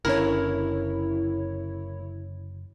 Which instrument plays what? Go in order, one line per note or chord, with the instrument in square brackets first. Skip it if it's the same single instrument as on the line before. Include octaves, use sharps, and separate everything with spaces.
[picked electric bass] F#1 D3 C#4 [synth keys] E4 C#5 [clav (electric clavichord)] A#4